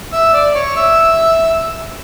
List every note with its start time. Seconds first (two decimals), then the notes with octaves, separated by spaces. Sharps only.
0.12 E5 E6
0.33 D5 D6
0.55 C#5 C#6
0.76 E5 E6